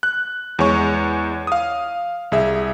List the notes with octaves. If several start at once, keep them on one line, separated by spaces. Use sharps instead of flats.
F#6
E2 G#3 C#5 C#6
F5 D#6
C2 G#4 E5